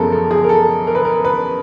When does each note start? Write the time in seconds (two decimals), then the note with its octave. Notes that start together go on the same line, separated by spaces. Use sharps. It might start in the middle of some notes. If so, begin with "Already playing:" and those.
Already playing: F#2 C#3 F3 G#3 B3 A4 A#4
0.12 A4
0.31 G#4
0.44 A#4
0.49 A4
0.87 A#4
0.95 B4
1.05 A#4
1.25 B4